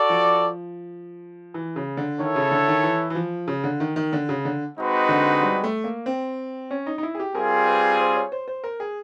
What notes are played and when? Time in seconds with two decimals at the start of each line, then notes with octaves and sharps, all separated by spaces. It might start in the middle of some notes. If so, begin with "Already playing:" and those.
Already playing: F#4 A4 D5
0.09 F3
1.54 E3
1.76 C#3
1.97 D3
2.19 D#3 E4 A4 C#5
2.36 C#3
2.51 D3
2.68 D#3
2.83 E3
3.10 E3
3.15 F3
3.48 C#3
3.64 D3
3.80 D#3
3.96 D#3
4.13 D3
4.29 C#3
4.45 D3
4.78 G#3 C4 D#4 F#4 B4
5.09 D3
5.42 G3
5.64 A3
5.84 A#3
6.06 C4
6.71 C#4
6.87 D#4
6.98 D#4
7.03 E4
7.15 G#4
7.19 G4
7.35 G3 C4 F4 G#4 A#4
7.67 B4
8.00 C5
8.16 C#5
8.32 C5
8.48 C5
8.64 A#4
8.80 G#4